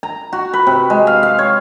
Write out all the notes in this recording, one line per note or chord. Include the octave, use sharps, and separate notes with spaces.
A#5
F#4
B4
C3
G#3
F5
F5
C#5